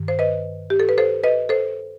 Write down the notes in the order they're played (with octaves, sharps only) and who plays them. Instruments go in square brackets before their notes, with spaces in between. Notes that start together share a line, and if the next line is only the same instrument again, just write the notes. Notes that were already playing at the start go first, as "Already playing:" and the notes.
Already playing: [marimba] G2 D#3
C5
B4 D#5
G4
A4
B4
A4 C5
B4 D#5
A4 C5